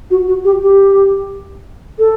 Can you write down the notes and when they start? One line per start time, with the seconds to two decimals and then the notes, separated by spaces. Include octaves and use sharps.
0.10 F#4
0.28 F#4
0.45 G4
0.62 G4
1.99 A4